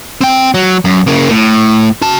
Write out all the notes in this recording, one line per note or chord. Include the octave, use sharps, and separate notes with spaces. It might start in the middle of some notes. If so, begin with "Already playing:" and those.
C4 G5
F#3
F#2
C#3 A#3
A2
F#4 A5